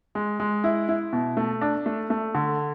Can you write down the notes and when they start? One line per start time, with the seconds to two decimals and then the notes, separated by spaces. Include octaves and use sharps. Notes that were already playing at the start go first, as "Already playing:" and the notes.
0.15 G#3
0.40 G#3
0.64 E4
0.89 E4
1.13 B2
1.37 A3
1.61 D4
1.86 A3
2.10 A3
2.35 D3